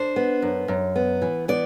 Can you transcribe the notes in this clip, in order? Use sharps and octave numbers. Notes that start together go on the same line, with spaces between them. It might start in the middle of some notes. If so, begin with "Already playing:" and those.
Already playing: D4 C5
B3
F#2
F#2
B3
E3
B3 D5